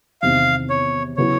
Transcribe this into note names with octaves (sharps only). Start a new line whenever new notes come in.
E2 C3 D#3 F5
C#5
C#3 F#3 B3 E4 C#5